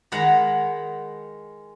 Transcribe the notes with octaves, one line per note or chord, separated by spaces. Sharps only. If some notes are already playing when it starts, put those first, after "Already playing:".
D#3 G#3 F#5 A#5 B5